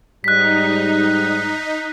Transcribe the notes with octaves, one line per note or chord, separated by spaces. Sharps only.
G#2 G3 D#4 F#6 B6